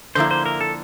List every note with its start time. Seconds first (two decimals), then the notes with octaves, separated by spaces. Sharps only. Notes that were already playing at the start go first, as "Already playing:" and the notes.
0.15 D3 F3 A#3 E4 C5
0.31 C5
0.46 A#4
0.61 A4